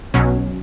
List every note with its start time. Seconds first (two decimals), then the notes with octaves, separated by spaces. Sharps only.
0.14 B1 B2 F#3 C#4